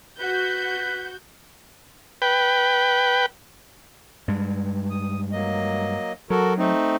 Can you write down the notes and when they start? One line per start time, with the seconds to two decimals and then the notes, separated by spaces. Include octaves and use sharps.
0.19 F#4 B4 G6
2.22 B4 G5
4.28 G2 G#3
4.90 D#6
5.32 F#3 A#3 D#5
6.30 F#3 F#4 A4 A#4
6.58 A3 C4 D#4